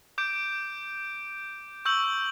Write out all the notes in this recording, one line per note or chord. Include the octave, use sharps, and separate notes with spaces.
D6 G6 D7
C#6 E6 G6 F#7